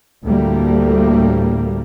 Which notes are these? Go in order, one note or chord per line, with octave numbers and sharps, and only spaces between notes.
D2 A2 G3 A3 A#3